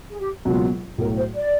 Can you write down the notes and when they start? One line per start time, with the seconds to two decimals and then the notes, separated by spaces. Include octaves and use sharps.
0.09 G#4
0.19 G4
0.45 C#2 B2 F#3 A#3 F4
0.98 B1 A2 F#3 A#4
1.16 C5
1.34 D5